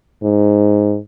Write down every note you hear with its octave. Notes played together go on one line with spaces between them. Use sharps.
G#2